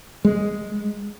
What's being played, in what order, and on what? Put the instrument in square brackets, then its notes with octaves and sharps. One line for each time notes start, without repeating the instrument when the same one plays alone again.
[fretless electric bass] G#3